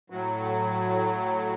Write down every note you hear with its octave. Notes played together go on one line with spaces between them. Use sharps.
A2 F#3